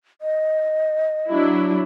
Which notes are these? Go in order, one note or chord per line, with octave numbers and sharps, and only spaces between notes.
D#5
F#3 D4 E4